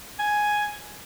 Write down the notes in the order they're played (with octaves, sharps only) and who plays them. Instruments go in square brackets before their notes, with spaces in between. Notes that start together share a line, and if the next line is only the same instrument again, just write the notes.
[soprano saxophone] G#5